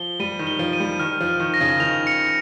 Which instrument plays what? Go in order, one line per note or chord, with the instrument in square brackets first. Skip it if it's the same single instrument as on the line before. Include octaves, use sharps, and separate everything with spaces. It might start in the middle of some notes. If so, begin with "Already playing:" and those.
Already playing: [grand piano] F3 [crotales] G7
[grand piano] G3 [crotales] D#7
[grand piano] D#3
[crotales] G7
[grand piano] F3
[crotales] D#7
[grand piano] G3
[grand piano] D#3 [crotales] F6
[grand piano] F3
[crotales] F6
[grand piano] D#3
[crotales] A#6
[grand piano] C#3
[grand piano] D#3 [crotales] F7
[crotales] C#7